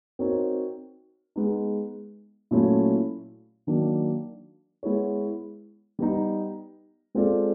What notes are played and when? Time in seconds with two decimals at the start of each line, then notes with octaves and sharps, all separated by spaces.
0.19 C4 D#4 F#4 A#4 C#5
1.36 G#3 B3 D#4
2.51 A#2 F#3 A3 C#4 E4
3.67 D#3 F#3 A#3 D4
4.83 G#3 B3 E4 G#4 C#5
5.99 G3 B3 D#4
7.15 G#3 C4 F4 A4 D5